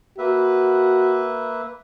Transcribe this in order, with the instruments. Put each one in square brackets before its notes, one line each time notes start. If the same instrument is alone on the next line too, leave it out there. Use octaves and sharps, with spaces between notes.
[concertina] A#3 B4 E5 [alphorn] F#4